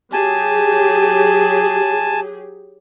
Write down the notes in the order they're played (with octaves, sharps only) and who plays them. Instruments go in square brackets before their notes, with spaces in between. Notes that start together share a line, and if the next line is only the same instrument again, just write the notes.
[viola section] F#3 G4 G#4 [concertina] G#5 A5